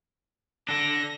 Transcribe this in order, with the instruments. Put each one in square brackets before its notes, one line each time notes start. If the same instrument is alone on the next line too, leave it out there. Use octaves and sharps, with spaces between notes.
[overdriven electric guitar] D4 A4 [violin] A#6